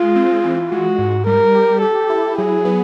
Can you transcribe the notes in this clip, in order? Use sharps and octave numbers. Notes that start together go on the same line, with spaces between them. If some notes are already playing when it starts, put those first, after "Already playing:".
Already playing: G#3 F4
C4
E3
G#3 F#4
G#2
G3 A#4
G4
G4 A4
E4
F#3 G#4
B3